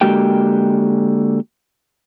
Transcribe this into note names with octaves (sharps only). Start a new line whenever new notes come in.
D3 G#3 A#3 F#4 G4 G5